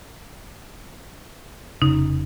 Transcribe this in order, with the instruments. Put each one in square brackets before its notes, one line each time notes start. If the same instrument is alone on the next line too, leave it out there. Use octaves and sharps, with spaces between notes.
[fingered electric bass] F1 C#3 [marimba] D#4